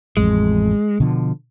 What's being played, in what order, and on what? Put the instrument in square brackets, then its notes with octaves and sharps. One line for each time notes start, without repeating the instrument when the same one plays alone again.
[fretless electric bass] A1 F2 [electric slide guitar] G#3
[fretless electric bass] B2 D3 F3